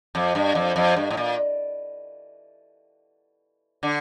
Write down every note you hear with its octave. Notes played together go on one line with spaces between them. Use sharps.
F2
G2
F2
F2
G2
A2
A#2
D3